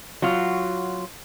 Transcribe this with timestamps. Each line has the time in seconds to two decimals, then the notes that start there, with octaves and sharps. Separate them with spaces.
0.22 F#3 F4